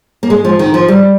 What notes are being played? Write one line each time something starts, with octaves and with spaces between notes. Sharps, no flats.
A#3
G#3
F3
D#3
F3
G3